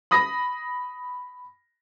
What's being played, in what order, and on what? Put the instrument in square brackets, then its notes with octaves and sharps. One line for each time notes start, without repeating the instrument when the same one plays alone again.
[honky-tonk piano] B5 D#6 A#6